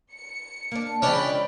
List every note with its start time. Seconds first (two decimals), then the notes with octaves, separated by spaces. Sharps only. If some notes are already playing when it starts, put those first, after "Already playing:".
0.13 C#7
0.72 A#3 D4
1.02 C#3 F3 G#3 C#4 D4 D5 G5 B5